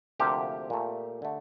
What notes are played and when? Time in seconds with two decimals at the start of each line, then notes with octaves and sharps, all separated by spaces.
0.19 D2 C3 F3 A#3 G4
0.70 A#2 A3
1.22 D3 A3